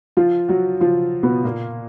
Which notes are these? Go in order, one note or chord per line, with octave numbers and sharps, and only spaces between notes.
F3 F4
F#3 F#4
F3 F4
B2 B3
A#2 A#3